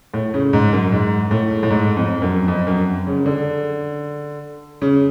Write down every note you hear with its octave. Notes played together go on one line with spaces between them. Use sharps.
A2
C#3
G#2
F#2
G#2
A2
A2
G#2
F2
F#2
F2
F#2
C#3
D3
C#3